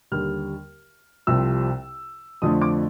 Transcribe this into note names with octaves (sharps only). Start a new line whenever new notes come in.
D#2 D3 G3 F6
C2 C3 F3 E6
F2 D3 F3 A3 D#6
D6